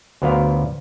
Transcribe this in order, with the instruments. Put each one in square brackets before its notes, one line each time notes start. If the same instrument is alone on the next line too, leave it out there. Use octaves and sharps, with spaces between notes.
[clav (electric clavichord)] D2 F#3 B3 F4 A#4 F5